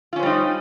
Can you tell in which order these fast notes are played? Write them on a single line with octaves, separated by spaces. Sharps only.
F4 C#4 C5 G3 D#4